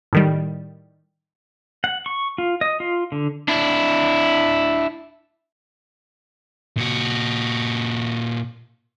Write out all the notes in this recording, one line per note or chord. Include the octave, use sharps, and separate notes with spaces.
A2 D#3 G3
F#5
C#6
F4
D#5
F4
D3
D4 E4
A#2 F#4